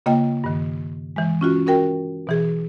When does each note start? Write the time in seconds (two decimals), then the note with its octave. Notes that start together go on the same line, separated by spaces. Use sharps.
0.06 C#3 A#3 F4 D#5 G5
0.44 G2 D#3
1.16 E3 G#3
1.41 C#4 F4 F#4
1.67 C#4 F#4 A#4 G5
2.27 B2 E3 G#4